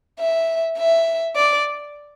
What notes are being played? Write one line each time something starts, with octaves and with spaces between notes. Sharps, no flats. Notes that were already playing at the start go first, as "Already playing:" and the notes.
E5
E5
D5